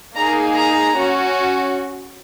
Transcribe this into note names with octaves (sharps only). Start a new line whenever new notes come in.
A#3 D#4 G#4 A#5
A#5
C#4 F#4